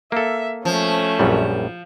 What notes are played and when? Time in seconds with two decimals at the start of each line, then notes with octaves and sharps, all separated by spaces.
0.12 A#3 A4 E5
0.65 F3 A3 C#4
1.19 A#1 F#2 G3